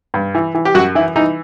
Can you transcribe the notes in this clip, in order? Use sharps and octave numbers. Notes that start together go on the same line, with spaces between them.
G2
E3
E3
G4
F#2 F#4
E3 E4
E3 D#4